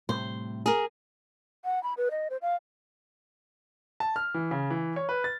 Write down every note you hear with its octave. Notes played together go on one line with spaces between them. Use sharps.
A2 C3 G3 C5
G#4 A#4
F#5
B5
B4
D#5
C5
F5
A5
F6
E3
C#3
E3
C#5
B4
A6